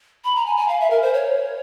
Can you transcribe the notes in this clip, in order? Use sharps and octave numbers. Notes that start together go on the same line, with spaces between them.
B5
A#5
G#5
G#5
F5
E5
A#4
C5
C#5